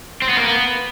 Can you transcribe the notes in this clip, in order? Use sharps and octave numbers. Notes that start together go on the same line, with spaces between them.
C4
B3
A#3
B3